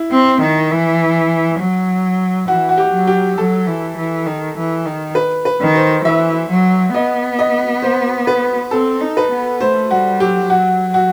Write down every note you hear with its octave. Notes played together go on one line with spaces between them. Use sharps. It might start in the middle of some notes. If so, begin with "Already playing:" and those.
Already playing: E4
C4
D#3
E3
F#3
E3 F#4
F#4
G4
F#3
G4
F#3 A4
E3
E3
D#3
E3
D#3
B4
B4
D#3
C5
E3 E5
F#3
B3 D#5
D#5
C5
B4
C4 A4
D#4
B4
B3
A3 C5
G3 F#4
F#3 G4
F#3 F#4
F#4